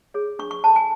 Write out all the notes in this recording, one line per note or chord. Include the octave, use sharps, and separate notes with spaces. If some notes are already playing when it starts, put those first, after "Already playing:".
G#4 C#5
D4 C#6
C#6
A4 C#5 A5
G#5